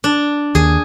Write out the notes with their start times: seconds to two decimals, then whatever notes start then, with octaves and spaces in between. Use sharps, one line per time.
0.04 D4
0.55 D#2 G#4